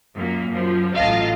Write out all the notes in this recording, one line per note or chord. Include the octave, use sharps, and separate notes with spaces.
F#2 A#2 A#3
F#2 F3
A1 F#3 F4 D#5 F5 A5